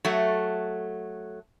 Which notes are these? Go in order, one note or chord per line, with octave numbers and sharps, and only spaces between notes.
F#3 A3